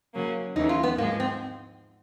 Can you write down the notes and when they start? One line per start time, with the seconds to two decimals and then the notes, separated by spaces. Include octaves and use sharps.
0.14 C#3 F#3 A#3 C#4
0.56 D#2 C#3 E3 A3 C#4 D#4
0.69 F4
0.83 B3
0.98 G#2 F3 G#3 A#3
1.20 C4